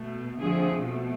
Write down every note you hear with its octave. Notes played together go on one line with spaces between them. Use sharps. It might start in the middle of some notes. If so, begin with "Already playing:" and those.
Already playing: B2 A3
F2 D3 F3 A3 G#4
B2 A3